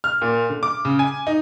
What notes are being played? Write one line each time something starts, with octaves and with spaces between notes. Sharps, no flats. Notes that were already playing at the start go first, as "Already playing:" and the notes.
F6
A#2
D3
D6
C#3
G#5
D#4